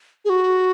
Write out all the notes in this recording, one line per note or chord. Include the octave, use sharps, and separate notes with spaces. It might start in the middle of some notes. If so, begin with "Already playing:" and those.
G#4
F#4